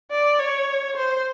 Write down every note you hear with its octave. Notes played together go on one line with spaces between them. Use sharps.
D5
C#5
C5